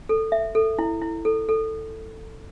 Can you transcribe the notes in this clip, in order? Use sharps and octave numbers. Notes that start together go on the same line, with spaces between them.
A4
E5
A4
E4
E4
A4
A4